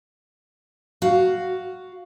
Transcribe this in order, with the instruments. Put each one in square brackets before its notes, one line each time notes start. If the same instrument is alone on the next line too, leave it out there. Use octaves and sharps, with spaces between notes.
[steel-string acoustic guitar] F#4 F5